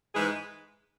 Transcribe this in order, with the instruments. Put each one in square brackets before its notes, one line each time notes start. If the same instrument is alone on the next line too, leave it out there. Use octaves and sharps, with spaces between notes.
[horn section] G#2 E3 G#3 G#4 B4